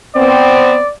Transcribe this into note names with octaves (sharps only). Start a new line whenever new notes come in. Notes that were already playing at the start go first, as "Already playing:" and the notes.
B3 C4 D5